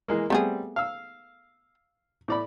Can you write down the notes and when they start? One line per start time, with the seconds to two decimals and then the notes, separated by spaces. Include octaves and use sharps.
0.08 E3 G#3 A#3
0.30 G3 A3 B3 C4 G#4
0.76 F5 E6
2.28 A2 D5 B5